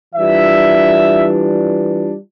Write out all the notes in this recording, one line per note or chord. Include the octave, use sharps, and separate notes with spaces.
E3 G3 D4 F4 E5